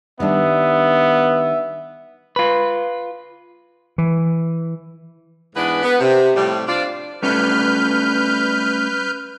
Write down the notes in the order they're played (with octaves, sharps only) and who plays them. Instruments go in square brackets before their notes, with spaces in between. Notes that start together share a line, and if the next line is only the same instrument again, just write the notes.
[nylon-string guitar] D#3 G3 D4 [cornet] B3 [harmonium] E5
[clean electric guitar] F4 B4
[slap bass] E3
[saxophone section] G#2 E3 B3 D4 G#4 B4
B3
C3
A2 C3 F3 G3
D4 F4 C5 D5
[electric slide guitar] G3 A3 C#4 [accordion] B4 F6 G6